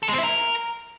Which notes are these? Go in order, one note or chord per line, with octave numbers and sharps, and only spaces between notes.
A4
G#3
C4
E4
A#4